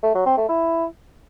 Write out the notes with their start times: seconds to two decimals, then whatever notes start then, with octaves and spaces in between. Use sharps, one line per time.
0.03 A3
0.15 F#3
0.26 C4
0.37 A3
0.49 E4